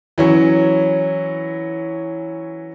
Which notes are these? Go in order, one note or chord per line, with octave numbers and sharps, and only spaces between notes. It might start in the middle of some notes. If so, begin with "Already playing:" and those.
E3 F#3 C#4